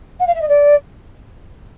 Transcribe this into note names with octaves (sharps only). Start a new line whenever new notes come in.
F#5
F5
E5
D#5
D5